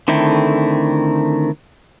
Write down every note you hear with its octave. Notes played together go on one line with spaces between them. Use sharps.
D3 D#3 A3 C4 E4